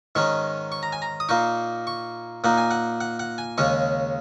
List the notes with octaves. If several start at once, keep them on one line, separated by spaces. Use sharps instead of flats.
G#2 D#3 G#3 C#4 C#6
C#6
A#5
G#5
A#5
D#6
A#2 A#3 D#4 C#6
C#6
A#2 A#3 D#4 F#5
G#5
F#5
F#5
F#5
G#5
D#2 C#3 G#3 C#4 C#6